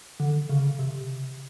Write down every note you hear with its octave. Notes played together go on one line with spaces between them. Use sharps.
D3
C#3
C3